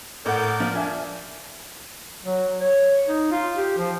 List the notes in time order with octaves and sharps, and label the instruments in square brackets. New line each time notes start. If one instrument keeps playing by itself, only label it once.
[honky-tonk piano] A2 F#5 [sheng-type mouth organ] A#4 D5 G6
[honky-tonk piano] F3
[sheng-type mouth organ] D4 [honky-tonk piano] E5 G#5
[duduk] F#3
C#5
D#4
F4
G4
F3